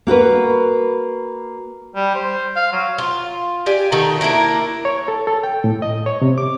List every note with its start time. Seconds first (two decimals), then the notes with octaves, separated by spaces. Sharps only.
0.07 A#3 F#4 A#4 B4
1.96 G3
2.15 C5
2.56 F5
2.73 F#3
2.98 F4
3.66 G4 D5 G#5
3.92 D#3 A3 F#4 A#5
4.21 A#3 D4 E4 A#4
4.85 C#5
5.08 A4
5.27 A4
5.43 G5
5.64 A2
5.82 D#5
6.06 C#5
6.22 C3
6.38 D6